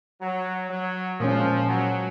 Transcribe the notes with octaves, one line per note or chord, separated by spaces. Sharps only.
F#3
F#3
A#2 F3 G#3 C#4
F#3